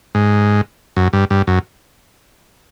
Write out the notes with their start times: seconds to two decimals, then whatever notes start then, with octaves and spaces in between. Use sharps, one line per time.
0.15 G#2
0.97 F#2
1.13 G2
1.30 G2
1.47 F#2